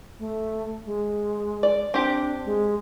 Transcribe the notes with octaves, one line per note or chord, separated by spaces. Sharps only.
A3
G#3
D5
C4 D4 G4
G#3